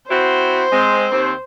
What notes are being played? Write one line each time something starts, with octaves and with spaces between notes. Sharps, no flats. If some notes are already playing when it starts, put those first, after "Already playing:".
C4 E4 F#4 C5
G#3 C4
D#2 C4